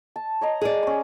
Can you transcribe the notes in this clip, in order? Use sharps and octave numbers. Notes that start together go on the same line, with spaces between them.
A5
C#5 D#5 A#5
G#4 D5
C#4 C6